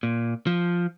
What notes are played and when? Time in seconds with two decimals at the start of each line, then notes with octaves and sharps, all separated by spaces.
0.03 A#2
0.47 F3